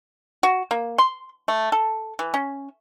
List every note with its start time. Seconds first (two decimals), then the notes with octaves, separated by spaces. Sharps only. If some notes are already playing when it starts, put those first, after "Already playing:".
0.43 F#4
0.71 A#3
0.98 C6
1.48 A3
1.72 A4
2.19 E3
2.34 C#4